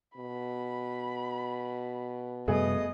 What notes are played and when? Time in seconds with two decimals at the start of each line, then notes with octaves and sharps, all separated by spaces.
0.17 B2 B5
2.48 F#2 C3 G3 A3 B3 G#4 D#5 D#6